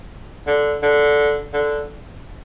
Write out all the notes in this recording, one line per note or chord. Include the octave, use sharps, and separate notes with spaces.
D3
D3
D3